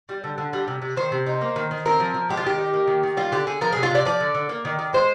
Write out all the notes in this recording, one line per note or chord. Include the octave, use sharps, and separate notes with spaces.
G3
D3
D3
G3
C3
C3
D#3 C5
C3
D#4
A#3
D#3
D#3
C4 A#4
F3
F3
G#3 G4
F4
D#3 G4
D#4
A#3
D#3
D#3
G3 F4
D3 G4
D3 G#4
F3 A#4
C3 G#4
F4
C3 D5
F3 D5
D3
D3
A#3
D#3
D#3
G#3 C5